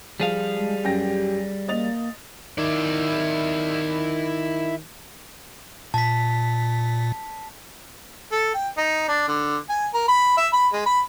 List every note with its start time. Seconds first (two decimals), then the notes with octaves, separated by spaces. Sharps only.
0.20 F3 G3 G#4 F5
0.55 G#3
0.84 F#2 G4 G5 A#6
1.68 A#3 D#5 A6 F7
2.58 D#3 E4 D5
5.94 A#2 A5 B6
8.32 A4
8.54 G5
8.77 D#4
9.08 D4
9.28 D3
9.69 G#5
9.94 A#4
10.08 B5
10.37 E5
10.53 B5
10.73 G#3
10.86 B5